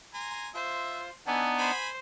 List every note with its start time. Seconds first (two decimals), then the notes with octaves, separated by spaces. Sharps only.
0.14 G#5 A#5 C6
0.54 F4 C5 E5
1.27 E3 B3 D4 D#4 G#5 A5
1.59 C5 G#5 B5